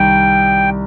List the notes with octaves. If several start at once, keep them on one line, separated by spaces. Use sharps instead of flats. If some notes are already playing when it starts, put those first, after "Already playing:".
Already playing: C2 D#3 G5